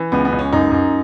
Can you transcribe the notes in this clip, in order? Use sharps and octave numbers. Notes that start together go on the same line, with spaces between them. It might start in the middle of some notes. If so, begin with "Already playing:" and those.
Already playing: E3
C#2 B3
B3
C#2
C#4
F#2 D#4
F#2